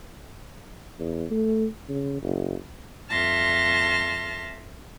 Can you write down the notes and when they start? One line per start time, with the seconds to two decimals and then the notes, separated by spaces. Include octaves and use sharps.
1.00 E2
1.31 A3
1.89 C#3
2.23 F#1
3.10 F2 E5 A5 C6 F6 A#6